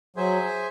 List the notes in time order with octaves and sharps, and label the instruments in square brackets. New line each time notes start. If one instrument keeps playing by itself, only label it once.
[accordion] F#3 [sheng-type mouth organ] G#4 C5 E5 G#5